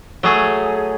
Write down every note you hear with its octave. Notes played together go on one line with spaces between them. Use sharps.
F#3 A3 G#4